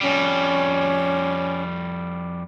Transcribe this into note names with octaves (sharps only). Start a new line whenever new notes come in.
F2 G3 C#4